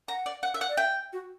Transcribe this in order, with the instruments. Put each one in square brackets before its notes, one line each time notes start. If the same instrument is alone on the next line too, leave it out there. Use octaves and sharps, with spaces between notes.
[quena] F#5 [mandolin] A#5
[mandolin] D5
F#5
E5
F#5
[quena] D5
[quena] E5 [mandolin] G5
[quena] F#4